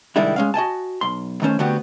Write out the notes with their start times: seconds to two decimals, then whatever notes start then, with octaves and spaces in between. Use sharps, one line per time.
0.16 C2 D#3 G3 G#3 D4 E4
0.36 G#3 C#4 F5
0.54 F#4 D#5 G#5 A5
1.01 B1 C6
1.42 D#3 A3 C#4 C5
1.59 D3 A3 B3 C4 F#4 G4